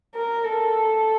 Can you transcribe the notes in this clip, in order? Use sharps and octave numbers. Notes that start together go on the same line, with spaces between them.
A#4
A4